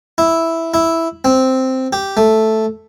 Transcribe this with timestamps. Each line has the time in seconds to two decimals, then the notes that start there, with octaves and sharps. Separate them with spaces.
0.18 E4
0.74 E4
1.25 C4
1.93 G4
2.17 A3